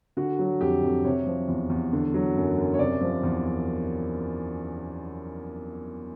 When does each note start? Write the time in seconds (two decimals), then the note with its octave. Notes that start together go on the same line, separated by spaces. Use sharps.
0.17 D3 F#4
0.39 F#3
0.61 F2 G4
0.83 F2
1.05 C3 C#5
1.27 F3
1.48 E2
1.70 E2
1.93 D3
2.14 F#3
2.36 F#2
2.58 F#2
2.74 C#5
2.79 C3 D5
3.01 F3
3.23 E2